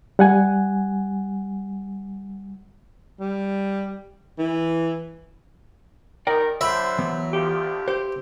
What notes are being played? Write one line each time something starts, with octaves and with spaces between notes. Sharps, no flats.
G3 F#5 G#5
G3
E3
D#3 G3 D#4 A#4 D5 G5
D3 F#3 C5 E5 B5
E3 B3
D2 D3 F3 G4
G4 C5